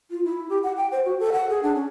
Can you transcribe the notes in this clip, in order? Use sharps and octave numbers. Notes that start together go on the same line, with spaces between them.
F4
E4
G4
F#5
G5
C5
F#4
A4
F#5
G#4
D4
C#4